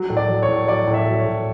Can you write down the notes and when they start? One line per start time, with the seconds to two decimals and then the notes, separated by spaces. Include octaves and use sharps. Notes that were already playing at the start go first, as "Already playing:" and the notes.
Already playing: F#3
0.10 A2
0.17 D5
0.28 F#3
0.43 C#5
0.49 A2
0.67 F#3 D5
0.88 A2
0.93 D5 E5
1.07 F#3
1.19 C#5
1.26 A2